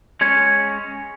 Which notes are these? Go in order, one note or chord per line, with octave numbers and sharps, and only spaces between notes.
G#3 C#4 C#5